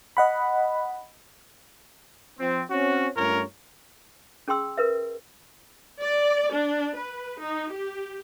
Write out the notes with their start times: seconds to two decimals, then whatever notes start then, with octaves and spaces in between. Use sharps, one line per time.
0.17 D#5 F#5 B5
2.40 F3 C4
2.71 C4 C#4 F#4
3.17 G2 A3 C#4 F4 A#4 C#5
4.48 C#4 G#4 G5 C6 E6
4.78 A#4 B4 E5
6.00 D5
6.52 D4
6.96 B4
7.41 D#4
7.72 G4